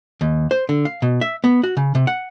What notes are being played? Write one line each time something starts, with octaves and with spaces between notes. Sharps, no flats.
D#2
C5
D3
F5
B2
E5
B3
F#4
C#3
C3
F#5